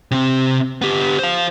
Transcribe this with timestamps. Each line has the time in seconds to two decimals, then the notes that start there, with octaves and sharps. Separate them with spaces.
0.11 C3 C4
0.82 B3 G4
1.19 C5 F5